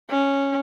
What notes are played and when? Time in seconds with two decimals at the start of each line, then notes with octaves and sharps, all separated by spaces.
0.10 C#4